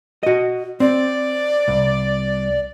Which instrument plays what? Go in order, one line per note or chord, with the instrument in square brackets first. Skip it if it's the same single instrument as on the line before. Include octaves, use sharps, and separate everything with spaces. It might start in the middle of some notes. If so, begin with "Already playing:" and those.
[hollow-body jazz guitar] F#4 D#5
[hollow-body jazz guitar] C4 [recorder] D5
[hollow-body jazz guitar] C2